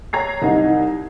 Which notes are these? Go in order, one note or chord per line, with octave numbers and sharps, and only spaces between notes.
C#5 A#5 G#6 C7
C2 D#4 E4